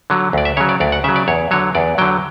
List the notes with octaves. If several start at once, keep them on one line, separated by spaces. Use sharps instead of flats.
D3 F#3
D2 D5
E5
C#3 F#3 C#5
D5
D2 D5
F#5
C#3 F#3 E5
D5
E2 C#5
D3 F#3 C#5
E2 D5
D3 F#3 G5